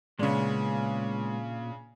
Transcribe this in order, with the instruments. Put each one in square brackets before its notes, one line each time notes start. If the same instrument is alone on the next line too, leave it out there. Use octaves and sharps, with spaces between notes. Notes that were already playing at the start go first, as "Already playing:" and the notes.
[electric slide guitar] A#2 [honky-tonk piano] C#3 D4 [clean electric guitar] G#3 B3 C#4